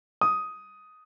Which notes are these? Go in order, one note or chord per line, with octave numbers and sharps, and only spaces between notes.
D#6